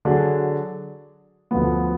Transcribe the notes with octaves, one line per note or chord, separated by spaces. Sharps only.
D3 F#3 D4 G#4
D2 D3 F3 B3